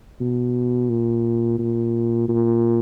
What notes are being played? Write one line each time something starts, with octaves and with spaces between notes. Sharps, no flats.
B2
A#2
A#2
A#2